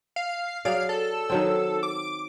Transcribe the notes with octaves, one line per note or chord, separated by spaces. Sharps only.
F5
F#3 G#4 D5 F5
A4
D#3 F#3 C4
D6